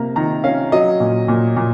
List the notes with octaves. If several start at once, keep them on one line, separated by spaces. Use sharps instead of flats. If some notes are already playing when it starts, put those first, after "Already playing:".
Already playing: C3 A#3 A#5
D#3 A#5
C#4 F5
F#3 D#5
A#2
A#2
A#2